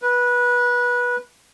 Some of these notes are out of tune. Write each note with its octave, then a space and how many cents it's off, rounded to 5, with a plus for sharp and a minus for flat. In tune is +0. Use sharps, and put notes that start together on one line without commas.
B4 -20